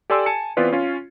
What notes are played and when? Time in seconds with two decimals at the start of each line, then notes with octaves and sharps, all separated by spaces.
0.10 G4 A4 D5 G#5 C6 E6
0.26 G#5 A5 C#7
0.57 E3 B3 C4 F4 B4 D5
0.72 C#4 F4